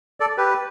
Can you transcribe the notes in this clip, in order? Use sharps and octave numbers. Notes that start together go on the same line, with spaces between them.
A4 D5
G4 B4